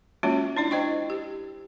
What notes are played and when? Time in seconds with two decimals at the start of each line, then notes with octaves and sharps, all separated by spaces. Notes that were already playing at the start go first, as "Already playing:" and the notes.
0.23 G#3 A#3 C#4 F4 F#4 C#5
0.57 D4 E4 D5
0.71 C5 D#5 G5 C#6
1.10 G4